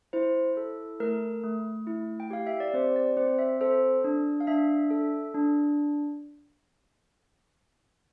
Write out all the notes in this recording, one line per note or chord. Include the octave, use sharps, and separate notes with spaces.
E4 C5
A4
A3 A#4
A3
E4
G5
G4 F5
E5
D5
C4 C5
D5
C4 C5
E5
A4 C5
D4
F5
D4 E5
A4
D4